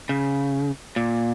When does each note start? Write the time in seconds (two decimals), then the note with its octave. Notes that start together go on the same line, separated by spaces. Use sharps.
0.09 C#3
0.96 A#2